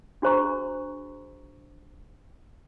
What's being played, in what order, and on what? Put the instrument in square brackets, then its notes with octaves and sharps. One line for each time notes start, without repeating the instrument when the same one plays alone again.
[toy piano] D4 F#4 G#4 C5 A#5 C#6